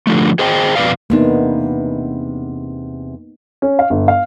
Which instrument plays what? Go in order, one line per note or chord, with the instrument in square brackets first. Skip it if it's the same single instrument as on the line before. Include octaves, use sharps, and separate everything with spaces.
[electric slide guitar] D3 F3 A3
G#4 C5 D#5 G5
F2 B2 B4 D5 F5
[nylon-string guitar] E2 C3 D4 [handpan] A#3 B3 D#4
[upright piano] C#4
F5
G1
F5